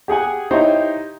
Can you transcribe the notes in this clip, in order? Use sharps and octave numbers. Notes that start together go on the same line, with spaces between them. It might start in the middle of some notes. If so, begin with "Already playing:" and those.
G4 G#4 F#5 G#5
D#4 E4 G4 C5 C#5 D#5